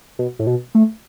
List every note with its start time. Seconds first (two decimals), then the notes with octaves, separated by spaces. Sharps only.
0.19 B2
0.39 A2
0.47 B2
0.75 A3